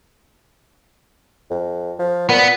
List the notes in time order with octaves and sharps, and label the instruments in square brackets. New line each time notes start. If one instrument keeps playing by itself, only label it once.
[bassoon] F2
F3
[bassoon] A#2 [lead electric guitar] B3